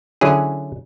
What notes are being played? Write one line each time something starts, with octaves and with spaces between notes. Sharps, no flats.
D3 F#3 C#4 E4 G#4